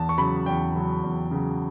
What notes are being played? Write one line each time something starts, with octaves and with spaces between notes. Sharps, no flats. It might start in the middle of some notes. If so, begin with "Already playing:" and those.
Already playing: E2 A5
C#6
C#3 F#3 B5
E2 G5
C#3 F#3
E2
C#3 F#3